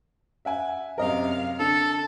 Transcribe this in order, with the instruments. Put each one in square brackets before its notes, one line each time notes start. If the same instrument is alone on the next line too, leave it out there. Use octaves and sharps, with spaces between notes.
[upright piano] E5 F#5 G#5
[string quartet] F#2 C3 F5 [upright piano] A#4 D#5
[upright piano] D3 D4 [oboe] A4 [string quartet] A5